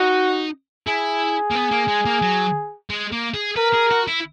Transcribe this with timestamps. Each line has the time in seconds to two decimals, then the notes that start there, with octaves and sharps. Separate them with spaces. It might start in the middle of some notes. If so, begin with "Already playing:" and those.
Already playing: D#4 F#4
0.87 E4 G#4
1.51 A#3
1.55 B3
1.71 A#3
1.88 G#3
2.05 A#3
2.22 F#3
2.90 G#3
3.12 A#3
3.34 G#4
3.57 A#4 B4
3.74 G#4
3.91 F#4
4.07 E4